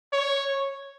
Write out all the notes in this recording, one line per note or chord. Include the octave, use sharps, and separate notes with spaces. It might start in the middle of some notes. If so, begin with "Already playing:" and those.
C#5